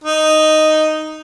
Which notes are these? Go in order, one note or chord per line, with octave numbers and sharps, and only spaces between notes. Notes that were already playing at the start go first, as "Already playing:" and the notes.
D#4